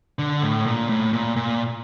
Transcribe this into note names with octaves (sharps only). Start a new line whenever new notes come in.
D3
A2
A#2
A2
A#2
A#2